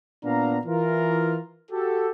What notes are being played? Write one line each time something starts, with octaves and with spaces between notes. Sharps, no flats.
A#2 B3 D4 F5 A#5
E3 F4 A#4
F#4 G4 A4